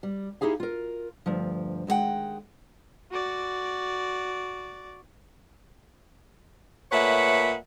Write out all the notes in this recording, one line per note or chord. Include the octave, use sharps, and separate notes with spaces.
G3
D#4 E4 G4 G#4 F5
F4 A#4
D2 G2 F3
D#2 G#3 C4 F#5 G5
F#4 D5
A#2 A3 B4 C#5 E5 F#5